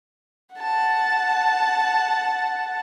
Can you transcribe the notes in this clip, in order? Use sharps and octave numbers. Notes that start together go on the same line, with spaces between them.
F#5 A5